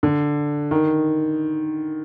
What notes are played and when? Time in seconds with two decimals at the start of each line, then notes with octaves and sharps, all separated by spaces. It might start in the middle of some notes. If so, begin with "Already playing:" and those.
0.03 D3
0.71 D#3